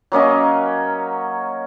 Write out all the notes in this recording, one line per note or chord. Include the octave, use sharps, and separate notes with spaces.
F#3 A#3 C#4 D#5